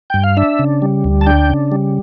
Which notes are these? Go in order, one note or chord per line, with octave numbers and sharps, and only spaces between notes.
G2 G5
F5
D4 E5
C#3
G3
D2
A5
D4 G5
C#3
G3